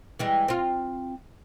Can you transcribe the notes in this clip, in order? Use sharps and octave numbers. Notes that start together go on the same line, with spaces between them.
E3 G3 G#3
C4 F4